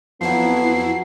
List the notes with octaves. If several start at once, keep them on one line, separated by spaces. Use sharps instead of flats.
F2 F3 F#3 B3 E4 C7